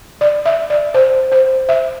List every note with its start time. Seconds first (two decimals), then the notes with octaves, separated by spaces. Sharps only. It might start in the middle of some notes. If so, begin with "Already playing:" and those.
0.21 D5
0.46 E5
0.70 D5
0.94 C5
1.32 C5
1.69 E5